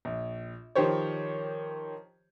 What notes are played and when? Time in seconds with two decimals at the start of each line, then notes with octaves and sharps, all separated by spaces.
0.05 A#1
0.75 D#3 F3 G4 C5 C#5